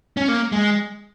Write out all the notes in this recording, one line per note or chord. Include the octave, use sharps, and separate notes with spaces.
C#4
A#3
G#3